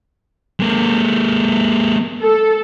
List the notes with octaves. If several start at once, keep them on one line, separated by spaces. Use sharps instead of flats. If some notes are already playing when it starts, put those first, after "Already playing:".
G#3 A#3
A4